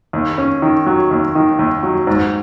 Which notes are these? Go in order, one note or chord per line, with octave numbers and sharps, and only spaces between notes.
D#2
C#4
D#3
F#3
D#2
D#3
D#2
F#3
G#2